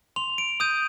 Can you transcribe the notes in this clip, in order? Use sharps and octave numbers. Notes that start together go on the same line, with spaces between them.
C6 F7
D7
D#6 G6 D#7